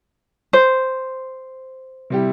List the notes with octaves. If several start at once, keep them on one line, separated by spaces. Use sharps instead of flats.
C5
C3 G3 E4 G4